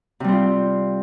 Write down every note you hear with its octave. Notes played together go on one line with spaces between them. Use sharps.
C3 G3 C4 F4